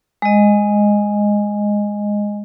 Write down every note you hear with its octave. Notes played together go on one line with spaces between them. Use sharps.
G#3 D#5